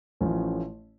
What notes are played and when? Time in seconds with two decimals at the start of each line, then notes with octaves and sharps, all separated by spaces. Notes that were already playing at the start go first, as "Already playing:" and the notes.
0.21 A1 A2 F3 A3 C#4